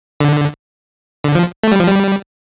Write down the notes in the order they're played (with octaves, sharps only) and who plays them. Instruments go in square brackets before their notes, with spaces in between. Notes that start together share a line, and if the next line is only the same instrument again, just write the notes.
[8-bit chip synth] D3
D3
F3
A3
G3
F3
G3